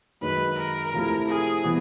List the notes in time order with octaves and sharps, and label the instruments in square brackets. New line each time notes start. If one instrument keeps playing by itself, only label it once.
[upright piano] F#2 D#3 G#3 [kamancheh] B4
[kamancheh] A#4
[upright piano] C3 F3 A3 C4 E4
[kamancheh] G#4
[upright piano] C3 E3 G3 B3